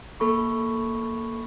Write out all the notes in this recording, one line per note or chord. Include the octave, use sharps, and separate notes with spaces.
A#3 A4 B5 C#6